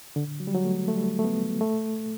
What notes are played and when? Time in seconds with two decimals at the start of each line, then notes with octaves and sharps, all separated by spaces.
0.16 D3
0.40 F#3
0.47 G3
0.55 F#3
0.64 A3
0.88 A3
0.96 G3
1.04 A3
1.19 A3
1.24 B3
1.61 A3